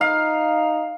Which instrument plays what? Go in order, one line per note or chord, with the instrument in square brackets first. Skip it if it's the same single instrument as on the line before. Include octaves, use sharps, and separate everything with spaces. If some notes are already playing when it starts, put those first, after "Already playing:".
[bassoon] D#4 [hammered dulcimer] F5